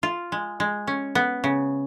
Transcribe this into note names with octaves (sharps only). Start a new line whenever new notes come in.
F4
G#3
G#3
C#4
B3
C#3